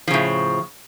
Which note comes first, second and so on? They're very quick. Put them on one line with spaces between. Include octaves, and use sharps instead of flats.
F3 C#3 A2